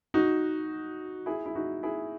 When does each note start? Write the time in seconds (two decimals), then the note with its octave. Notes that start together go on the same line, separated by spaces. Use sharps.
0.14 D#4 F#4
1.26 E4 G#4
1.46 E4
1.55 D#4 F#4
1.83 E4 G#4